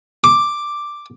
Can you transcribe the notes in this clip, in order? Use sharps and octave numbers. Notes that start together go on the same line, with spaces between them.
D6